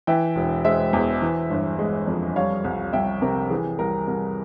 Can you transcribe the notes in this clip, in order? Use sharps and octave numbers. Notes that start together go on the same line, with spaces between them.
E3 E5 G5
E1
G#3 C5 E5
E2
E3
G1
G#3
F2
G3 C#5 F5
C2
C2 E5 G5
C3 A#4
E3 G#4
C2 A#4
C2 A#4